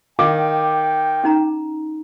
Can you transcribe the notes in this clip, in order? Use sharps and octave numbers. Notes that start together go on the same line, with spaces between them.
D#3 F5 G5 D6
C#4 D#4 A#5